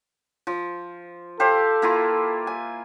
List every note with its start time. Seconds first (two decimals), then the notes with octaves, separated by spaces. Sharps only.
0.47 F3
1.40 G4 A4 C5 F5
1.82 A#3 E4 F4
2.47 G#5